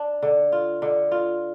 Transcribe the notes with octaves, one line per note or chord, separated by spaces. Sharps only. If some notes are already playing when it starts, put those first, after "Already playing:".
Already playing: D4 D5
D3
F4
D3
F4